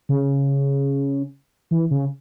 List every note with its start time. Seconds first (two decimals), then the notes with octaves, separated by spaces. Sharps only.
0.09 C#3
1.71 E3
1.91 C#3